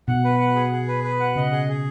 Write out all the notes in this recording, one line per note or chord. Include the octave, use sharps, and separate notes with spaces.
B2 F#5
B4
F#5
G#4
G#4
B4
B4
F#5
C#3 D#5
G#4
G#4